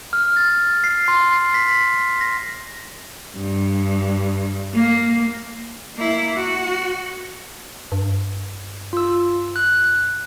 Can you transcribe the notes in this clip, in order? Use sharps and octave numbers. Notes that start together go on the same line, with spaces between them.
F6
A6
C7
C6
C7
B6
A#6
G2
A#3
A#3 E4
F#4
G2
F4 E6
F#6